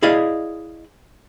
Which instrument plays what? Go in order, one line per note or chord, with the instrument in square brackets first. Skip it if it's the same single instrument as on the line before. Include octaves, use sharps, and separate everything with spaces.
[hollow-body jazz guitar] E4 G#4 D5 D#5 F5